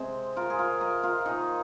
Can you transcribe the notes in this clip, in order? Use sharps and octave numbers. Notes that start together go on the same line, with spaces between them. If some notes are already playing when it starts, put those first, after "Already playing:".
Already playing: C3 G#3 C4 G#4 C5
F4 A#4
G#4
F4 A#4
A#4 D#5
F4 A#4
D#3 A#3 D#4 G#4